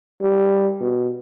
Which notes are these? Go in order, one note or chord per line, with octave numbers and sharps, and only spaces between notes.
G3
B2